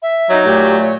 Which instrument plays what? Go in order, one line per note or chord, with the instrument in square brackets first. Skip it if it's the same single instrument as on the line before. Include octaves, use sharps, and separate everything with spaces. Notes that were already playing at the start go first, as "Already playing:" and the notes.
[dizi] E5
[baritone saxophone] F#3 [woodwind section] D#4
[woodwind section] A#2 A3 [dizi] G4
[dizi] C#5